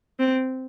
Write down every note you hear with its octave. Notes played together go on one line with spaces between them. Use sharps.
C4